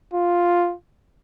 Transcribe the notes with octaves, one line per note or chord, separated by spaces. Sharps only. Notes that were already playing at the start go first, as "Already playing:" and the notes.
F4